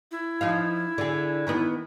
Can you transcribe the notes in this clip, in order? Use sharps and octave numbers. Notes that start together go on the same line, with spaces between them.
E4
F3 D#4 F5
D3 G#4
D#3 E3 B3